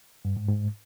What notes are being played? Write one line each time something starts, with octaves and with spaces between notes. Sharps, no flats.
G2
G#2
G#2